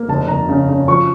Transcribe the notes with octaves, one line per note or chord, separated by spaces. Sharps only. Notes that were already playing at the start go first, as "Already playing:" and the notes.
Already playing: A#3
F1 A5
F1 A#5
C#3
C#3
F3 C#6